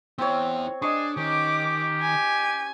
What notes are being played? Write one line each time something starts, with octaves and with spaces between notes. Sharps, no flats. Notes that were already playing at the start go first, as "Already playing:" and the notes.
B3 C4 E4 C#5
D4 G#4 D#5 C#6
D#3 C#4 G4 D6
G#5